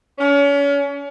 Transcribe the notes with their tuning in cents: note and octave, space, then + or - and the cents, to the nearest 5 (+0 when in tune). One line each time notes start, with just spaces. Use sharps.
C#4 +35